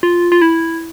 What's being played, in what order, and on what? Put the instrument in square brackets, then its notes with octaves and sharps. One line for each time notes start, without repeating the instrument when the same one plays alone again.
[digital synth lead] F4
F4
E4